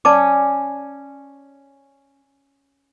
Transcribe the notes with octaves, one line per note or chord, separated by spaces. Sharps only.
C#4 D5 A5 D6